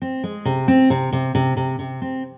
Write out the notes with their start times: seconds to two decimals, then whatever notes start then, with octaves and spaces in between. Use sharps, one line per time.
0.02 C4
0.24 G#3
0.45 C3
0.68 C4
0.90 C3
1.13 C3
1.35 C3
1.57 C3
1.79 C3
2.02 C4